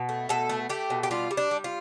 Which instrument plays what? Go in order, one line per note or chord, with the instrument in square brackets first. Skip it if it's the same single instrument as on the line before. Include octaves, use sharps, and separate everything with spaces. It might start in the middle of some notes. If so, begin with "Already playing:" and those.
Already playing: [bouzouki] B2
A3
B2 A4
A3
A3 G4
B2
G4
G3 F4
G3
D4
G3
F4